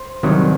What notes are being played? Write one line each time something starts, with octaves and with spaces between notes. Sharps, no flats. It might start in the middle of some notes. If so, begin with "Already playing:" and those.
Already playing: C5
C2 C3 D#3 F#3